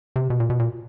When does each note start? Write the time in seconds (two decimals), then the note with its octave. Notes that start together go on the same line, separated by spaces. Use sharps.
0.16 C3
0.30 B2
0.40 A#2
0.50 B2
0.59 A#2